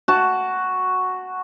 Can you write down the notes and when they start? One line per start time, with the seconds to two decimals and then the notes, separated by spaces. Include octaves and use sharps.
0.08 F#4 A5